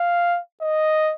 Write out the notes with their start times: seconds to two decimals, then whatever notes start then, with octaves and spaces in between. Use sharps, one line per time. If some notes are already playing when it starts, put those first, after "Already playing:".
Already playing: F5
0.62 D#5